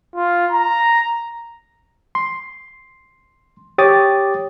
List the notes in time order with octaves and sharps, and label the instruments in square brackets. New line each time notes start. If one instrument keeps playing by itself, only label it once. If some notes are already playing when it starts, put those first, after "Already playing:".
[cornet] F4
A#5
[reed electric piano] C6
G4 C#5 D6 D#6 A6